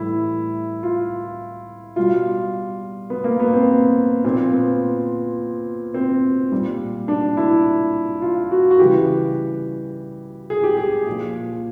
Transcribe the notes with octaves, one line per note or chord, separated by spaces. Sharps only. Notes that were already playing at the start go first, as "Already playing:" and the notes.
Already playing: A2 E3 G3 E4
F4
B2 G3 F4
B3
A#3
B3
C4
A#2 F3 C4
B3
C4
A#2 G3
D4
E4
F4
F#4
F#4
C#3 E3 G3 G4
G#4
G4
G#4
A#2 F3